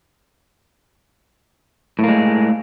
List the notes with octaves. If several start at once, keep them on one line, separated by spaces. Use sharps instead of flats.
A2 G#3 A#3